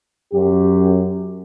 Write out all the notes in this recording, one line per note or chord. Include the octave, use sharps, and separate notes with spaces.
F#2 G4